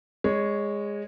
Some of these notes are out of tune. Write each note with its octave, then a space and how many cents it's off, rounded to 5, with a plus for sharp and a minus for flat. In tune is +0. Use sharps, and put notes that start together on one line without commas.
G#3 -15 C#5 +0